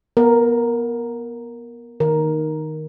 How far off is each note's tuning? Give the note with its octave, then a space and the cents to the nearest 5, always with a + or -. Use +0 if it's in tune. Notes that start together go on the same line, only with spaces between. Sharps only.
B3 -30 A#4 +0
D#3 -5 A#4 +5